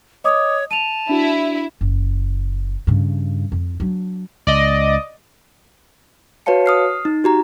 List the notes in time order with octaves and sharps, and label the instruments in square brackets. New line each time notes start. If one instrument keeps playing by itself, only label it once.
[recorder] C#5 [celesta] D#5 D6 D#6
[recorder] A5 [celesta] D#7 F7
[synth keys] D4 F#4 [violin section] E4
[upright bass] F#1
G2 C#3
F2
F#3 D4
[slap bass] C#2 [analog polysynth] D5 D#5
[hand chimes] F#4 B4 C#5 F5 A5 C#7
D#6 F6 C7
D#4
F#4 G4 A#5